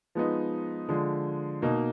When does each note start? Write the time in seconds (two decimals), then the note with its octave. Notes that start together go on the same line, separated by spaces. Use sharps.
0.15 F3 G#3 B3 D#4
0.89 D3 F3 G#3
1.62 B2 A#3 D#4